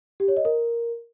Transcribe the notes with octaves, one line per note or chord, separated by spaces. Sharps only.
G4
C#5
D#5
A#4